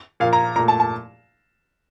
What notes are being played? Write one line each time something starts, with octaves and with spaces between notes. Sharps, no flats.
A#2 F3 A#3 F5
A#5
A#2 A3 A#5
A5
A5